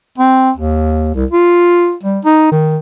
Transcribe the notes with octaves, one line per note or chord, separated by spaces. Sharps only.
C4
D#2
C2
F4
G3
D#4
D#3